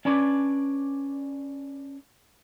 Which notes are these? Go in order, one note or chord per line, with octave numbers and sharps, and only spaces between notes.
C#4 D4 B4 C#5 D5